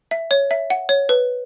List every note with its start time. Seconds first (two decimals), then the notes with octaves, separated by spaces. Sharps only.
0.11 E5
0.31 C#5
0.51 E5
0.70 F#5
0.89 C#5
1.09 B4